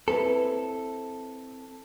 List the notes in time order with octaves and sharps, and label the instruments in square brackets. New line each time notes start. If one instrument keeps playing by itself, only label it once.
[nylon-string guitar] C4 E4 B4 [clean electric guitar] A4